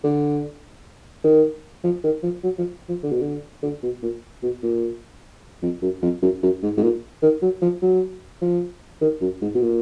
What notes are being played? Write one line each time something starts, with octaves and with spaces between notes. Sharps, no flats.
D3
D#3
F3
D#3
F3
F#3
F3
F3
D3
B2
D3
D3
B2
A#2
B2
A#2
F2
F#2
F2
F#2
F#2
G#2
G#2
A#2
D#3
F#3
F3
F#3
F3
D#3
F#2
G#2
B2
A#2